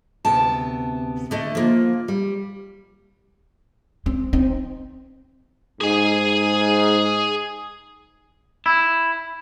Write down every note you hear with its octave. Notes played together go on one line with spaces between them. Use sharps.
D2 C3 B3 G5 A5
D3 A3 D#5
F3 A#3 F4
G3
C4
C4 D#4
G#2 G#4 G#5
E4